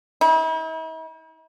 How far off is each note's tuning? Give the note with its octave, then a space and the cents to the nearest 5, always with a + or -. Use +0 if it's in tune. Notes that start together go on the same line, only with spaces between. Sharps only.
E4 -45